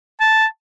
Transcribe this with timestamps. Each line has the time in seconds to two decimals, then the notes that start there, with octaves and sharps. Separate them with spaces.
0.21 A5